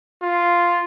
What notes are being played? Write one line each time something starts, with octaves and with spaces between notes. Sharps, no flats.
F4